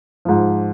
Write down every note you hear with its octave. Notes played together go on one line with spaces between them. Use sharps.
G#2 F3